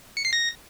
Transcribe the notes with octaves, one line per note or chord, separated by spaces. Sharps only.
C#7
C7
A#6